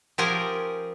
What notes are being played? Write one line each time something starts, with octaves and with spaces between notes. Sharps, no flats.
F3 C#4 G4 G#4 A#4